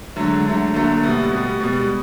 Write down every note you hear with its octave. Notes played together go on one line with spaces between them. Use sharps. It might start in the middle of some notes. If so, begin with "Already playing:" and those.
D3 F#3 G#3 A3
D3 F#3 A3
D3 F#3 A3 A#3
B2 G3 B3
B2 G3 A3 B3
B2 G3 G#3 B3